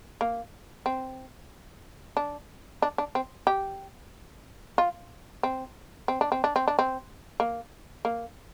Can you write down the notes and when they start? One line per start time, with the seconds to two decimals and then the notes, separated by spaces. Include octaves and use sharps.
0.21 A#3
0.86 C4
2.17 D4
2.82 D4
2.98 D4
3.15 C4
3.47 G4
4.78 F4
5.43 C4
6.08 C4
6.21 D4
6.32 C4
6.44 D4
6.56 C4
6.68 D4
6.79 C4
7.40 A#3
8.05 A#3